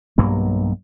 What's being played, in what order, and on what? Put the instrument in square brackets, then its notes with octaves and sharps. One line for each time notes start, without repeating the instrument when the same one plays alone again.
[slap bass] B1 G2 F#3 A#3